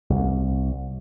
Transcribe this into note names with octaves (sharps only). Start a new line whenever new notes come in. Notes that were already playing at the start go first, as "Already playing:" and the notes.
C2